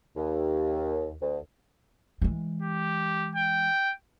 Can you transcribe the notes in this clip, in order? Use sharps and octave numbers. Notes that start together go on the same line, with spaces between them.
D#2
D2
E3 G#3
G4
G5